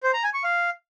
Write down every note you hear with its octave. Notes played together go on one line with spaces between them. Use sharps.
C5
A#5
G#5
C#6
F5